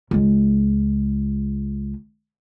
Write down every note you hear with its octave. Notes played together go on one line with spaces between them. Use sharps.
C#2 G#3